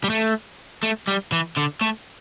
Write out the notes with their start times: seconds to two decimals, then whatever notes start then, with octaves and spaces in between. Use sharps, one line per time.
0.04 G3
0.10 A3
0.83 A3
1.08 G3
1.32 E3
1.57 D3
1.81 A3